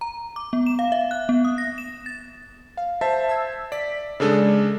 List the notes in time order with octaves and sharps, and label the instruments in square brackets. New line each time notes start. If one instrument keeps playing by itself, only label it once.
[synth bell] A#5
D6
B3
E7
F5
E5
F#6
B3
D#6
A#6
E7
A6
[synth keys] F5
[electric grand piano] C5 E5 A5
[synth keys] E6 G#6
[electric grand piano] D5 [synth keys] B6
[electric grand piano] C#3 D4 A4 [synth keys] G#3 G#4 D5